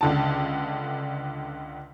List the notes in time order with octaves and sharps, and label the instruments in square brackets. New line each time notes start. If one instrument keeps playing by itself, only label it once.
[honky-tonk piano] C#2 D3 A5